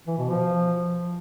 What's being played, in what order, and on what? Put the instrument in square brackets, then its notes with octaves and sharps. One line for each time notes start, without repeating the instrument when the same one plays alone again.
[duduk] E3
B2
F3